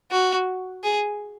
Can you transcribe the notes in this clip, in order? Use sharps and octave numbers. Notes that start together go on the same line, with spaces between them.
F#4
G#4